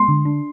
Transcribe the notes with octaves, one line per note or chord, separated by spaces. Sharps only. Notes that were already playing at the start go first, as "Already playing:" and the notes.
Already playing: G#3 C6
D3
D4